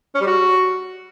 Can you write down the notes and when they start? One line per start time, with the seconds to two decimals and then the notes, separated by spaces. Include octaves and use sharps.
0.15 C#4
0.21 G3
0.27 F#4